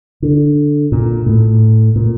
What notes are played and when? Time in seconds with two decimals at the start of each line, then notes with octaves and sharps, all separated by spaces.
0.22 D3
0.92 A#2
1.26 A2
1.96 A#2